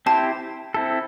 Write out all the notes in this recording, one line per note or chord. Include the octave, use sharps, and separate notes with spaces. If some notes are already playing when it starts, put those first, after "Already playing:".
C4 E4 G4 C5 A5
C4 E4 A4